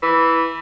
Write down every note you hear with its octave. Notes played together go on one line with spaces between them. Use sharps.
E3